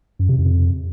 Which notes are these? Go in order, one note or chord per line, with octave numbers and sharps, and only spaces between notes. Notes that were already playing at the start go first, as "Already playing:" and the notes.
F#2
C3
F2